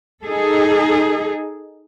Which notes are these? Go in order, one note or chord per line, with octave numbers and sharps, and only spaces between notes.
D#4 G#4 A4